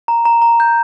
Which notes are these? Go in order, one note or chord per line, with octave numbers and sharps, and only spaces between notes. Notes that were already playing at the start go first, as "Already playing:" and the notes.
A#5
A#5
A#5
G6